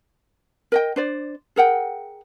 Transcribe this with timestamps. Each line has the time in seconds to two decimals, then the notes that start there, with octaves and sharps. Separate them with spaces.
0.72 A#4 D#5 G5
0.96 D4 C5 D5
1.56 G#4 A#4 F#5 G5